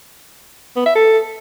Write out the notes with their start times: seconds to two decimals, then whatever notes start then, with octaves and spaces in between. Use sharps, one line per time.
0.76 B3
0.85 E5
0.95 A4